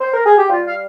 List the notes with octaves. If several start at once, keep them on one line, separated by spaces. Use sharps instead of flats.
C5
A#4
G#4
G4
G3 F4
F5